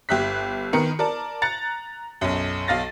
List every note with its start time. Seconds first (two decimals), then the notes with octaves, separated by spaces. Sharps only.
0.09 G1 G4 E5 F#6 B6
0.73 D#3 B3 A#4 C#7
0.99 A#4 D5 A5
1.42 A#5 F#6 A6 C#7
2.21 B1 F#2
2.67 B1 F5 A6 A#6